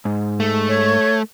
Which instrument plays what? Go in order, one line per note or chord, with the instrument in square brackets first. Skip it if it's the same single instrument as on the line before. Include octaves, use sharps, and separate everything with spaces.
[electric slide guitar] G#2
[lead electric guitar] A3
[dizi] C#5